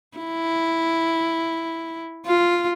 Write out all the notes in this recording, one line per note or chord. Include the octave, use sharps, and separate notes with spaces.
E4
F4